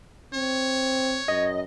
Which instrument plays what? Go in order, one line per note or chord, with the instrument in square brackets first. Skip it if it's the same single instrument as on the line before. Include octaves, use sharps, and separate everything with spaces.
[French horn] C4 [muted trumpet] C#5
[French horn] F#2 [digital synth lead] D#5